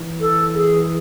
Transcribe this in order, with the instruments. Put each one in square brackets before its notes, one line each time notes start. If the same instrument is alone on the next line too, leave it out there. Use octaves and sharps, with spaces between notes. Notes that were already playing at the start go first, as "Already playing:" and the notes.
Already playing: [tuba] E3
[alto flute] A4
G#4